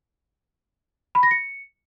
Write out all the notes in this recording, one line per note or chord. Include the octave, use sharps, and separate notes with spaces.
B5
A#6
C#7